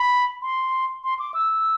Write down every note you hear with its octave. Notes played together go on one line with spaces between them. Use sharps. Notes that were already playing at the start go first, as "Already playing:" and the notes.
Already playing: B5
C6
C6
D6
E6